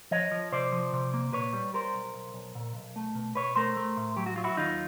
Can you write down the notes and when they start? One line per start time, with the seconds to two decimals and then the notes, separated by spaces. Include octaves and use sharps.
0.11 F3 C#5 D#5
0.31 F3
0.52 C3 C5 D5
0.72 F3
0.93 C3
1.14 A#3
1.33 A#2 B4 C#5
1.53 G3
1.74 G3 A#4 C5
1.94 B1
2.14 B1
2.34 B1
2.55 A#2
2.75 B1
2.96 A3
3.15 B2
3.35 B2 B4 C#5
3.55 A3 A#4 C5
3.77 A3
3.97 A2
4.16 F#3 G4
4.26 F#4
4.36 F#3 F4
4.44 E4 F#4
4.57 D#2 D#4 F4